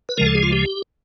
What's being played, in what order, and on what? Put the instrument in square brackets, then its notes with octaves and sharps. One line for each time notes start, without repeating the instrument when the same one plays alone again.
[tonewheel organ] B4
D2 C#3 F3 G#3 A#4
A4
G#4
F4
G4